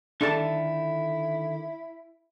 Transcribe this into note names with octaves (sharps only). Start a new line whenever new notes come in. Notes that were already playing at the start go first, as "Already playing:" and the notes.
D3 D#3 D4 E4 A4 A5